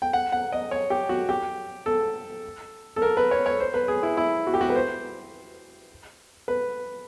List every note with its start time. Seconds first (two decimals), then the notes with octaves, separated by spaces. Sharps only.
0.02 G5
0.13 F#5
0.32 F#5
0.52 D#5
0.71 C#5
0.90 G4
1.09 F#4
1.29 G4
1.86 A4
2.96 A4
3.02 A#4
3.17 B4
3.31 C#5
3.46 C#5
3.60 C5
3.74 B4
3.88 G#4
4.03 E4
4.17 E4
4.47 F#4
4.54 G4
4.61 F#4
4.70 B4
4.76 C5
6.48 B4